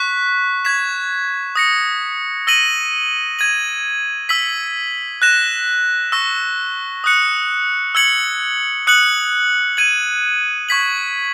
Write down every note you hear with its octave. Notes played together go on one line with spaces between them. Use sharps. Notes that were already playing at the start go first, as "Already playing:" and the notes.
Already playing: C#6 F#6 B6
G#6 B6 E7
D#6 A#6 C#7
E6 A#6 D#7 F#7
G#6 D#7 F#7
E6 B6 F#7
F#6 A#6 E7
C#6 E6 A#6
D#6 F#6 C#7
E6 G#6 C#7 F#7
D#6 F#6 C#7 F#7
G#6 D#7 F#7
C#6 G#6 B6 F#7